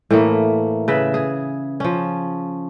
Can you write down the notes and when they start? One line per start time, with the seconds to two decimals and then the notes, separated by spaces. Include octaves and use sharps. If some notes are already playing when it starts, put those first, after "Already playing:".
0.10 A2 E3 A3 A#3
0.88 C#3 B4 E5
1.14 G#4
1.80 F3 C#4